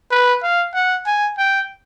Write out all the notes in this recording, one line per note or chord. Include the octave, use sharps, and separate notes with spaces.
B4
F5
F#5
G#5
G5